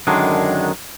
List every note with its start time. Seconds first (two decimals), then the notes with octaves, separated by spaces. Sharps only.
0.07 F#2 D3 D#3 G#3 D4